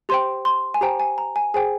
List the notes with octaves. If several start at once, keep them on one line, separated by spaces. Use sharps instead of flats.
G4 C5 G5 C6
C6
G#5
G4 C5 G5 A#5
G#5
A#5
G#5
G#4 C5 G5 G#5